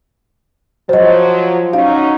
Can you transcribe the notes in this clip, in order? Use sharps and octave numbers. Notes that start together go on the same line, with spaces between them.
F3 F#3 C5 D#5
F#3 C#4 D#4 F5